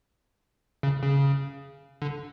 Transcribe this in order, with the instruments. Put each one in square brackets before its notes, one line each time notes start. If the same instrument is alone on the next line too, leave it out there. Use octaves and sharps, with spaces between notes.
[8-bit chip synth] C#3
C#3
D3